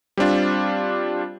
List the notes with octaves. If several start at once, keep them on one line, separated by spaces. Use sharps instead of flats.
G3 C4 D4 F4